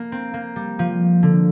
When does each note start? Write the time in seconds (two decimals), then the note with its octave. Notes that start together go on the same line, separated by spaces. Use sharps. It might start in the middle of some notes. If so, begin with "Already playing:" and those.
Already playing: A#3
0.12 C4
0.34 A#3
0.56 G3
0.79 F3
1.23 D3